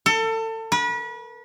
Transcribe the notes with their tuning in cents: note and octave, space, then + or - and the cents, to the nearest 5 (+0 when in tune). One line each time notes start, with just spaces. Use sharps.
A4 +30
B4 -35